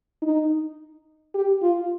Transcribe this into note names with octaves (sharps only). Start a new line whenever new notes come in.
D#4
G4
F4